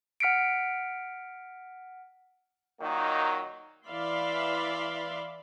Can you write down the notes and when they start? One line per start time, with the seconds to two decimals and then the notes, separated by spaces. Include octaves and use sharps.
0.20 F#5 F6 B6 C#7 D7
2.82 A#2 D#3 F#3 A#3 D#4
3.87 E3 D5 E5 F5 B5 C6